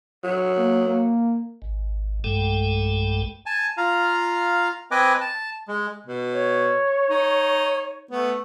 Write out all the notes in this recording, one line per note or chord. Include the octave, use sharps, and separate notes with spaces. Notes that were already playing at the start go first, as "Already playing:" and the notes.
F#3
A#3
A#3
G#1
B1 G2 G#3 A3 A4 G5
G#5 A5
F4 F5 A#5
C4 B4 D#5 G#5 D6
A5
G#3
B2
C#5
D#4
A3 B3